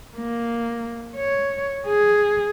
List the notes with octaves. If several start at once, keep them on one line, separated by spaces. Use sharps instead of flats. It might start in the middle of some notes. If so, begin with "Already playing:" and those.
A#3
C#5
G#4